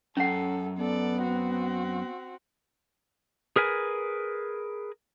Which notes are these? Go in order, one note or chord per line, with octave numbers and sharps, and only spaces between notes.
F#2 C#4 A4 F#5
B3 A4 D5
C4 F#4
G#4 A#4 B4 G#5